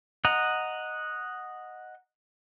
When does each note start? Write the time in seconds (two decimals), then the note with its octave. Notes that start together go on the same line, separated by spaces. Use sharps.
0.25 D#5 F#5 A#5